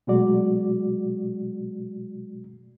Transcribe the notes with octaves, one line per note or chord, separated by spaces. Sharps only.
B2 F#3 G#3 A3 F#4 D5